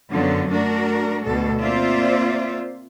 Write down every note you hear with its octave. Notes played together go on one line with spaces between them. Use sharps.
F#2 D3 F#3 B3 F4
A3 D4 F#4 A#4
D2 B2 A4
A#3 C4 F4 C5 D5 E5